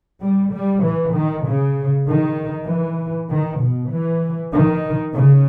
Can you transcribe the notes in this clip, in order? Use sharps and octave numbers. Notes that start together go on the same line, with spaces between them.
G3
G3
E3
D#3
C#3
D#3
E3
D#3
B2
E3
D#3
C#3